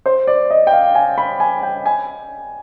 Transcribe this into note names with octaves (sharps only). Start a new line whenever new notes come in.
C5
D5
D#5
G5
F5
G#5
B5
G#5
G5
G#5